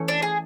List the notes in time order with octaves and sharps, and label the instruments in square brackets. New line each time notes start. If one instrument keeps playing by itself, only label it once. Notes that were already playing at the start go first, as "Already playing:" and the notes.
Already playing: [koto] E3 A3 C#4
[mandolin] D4
G#4